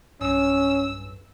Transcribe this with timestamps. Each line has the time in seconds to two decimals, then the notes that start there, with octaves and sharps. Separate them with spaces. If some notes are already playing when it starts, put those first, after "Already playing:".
0.21 B1 G2 C#4 E6